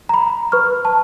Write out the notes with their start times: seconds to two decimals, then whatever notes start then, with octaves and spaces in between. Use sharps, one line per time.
0.09 A#5 B5
0.52 B4 C#6 F6
0.85 A5